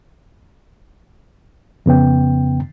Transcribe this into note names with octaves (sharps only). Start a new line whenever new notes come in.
F2 C#3 B3 G5